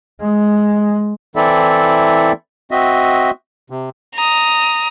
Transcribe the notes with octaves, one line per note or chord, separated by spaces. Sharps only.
G#3
E3 C4 E4 A4 D5 E5
C4 F#4 D#5 E5
C3
A#5 D#6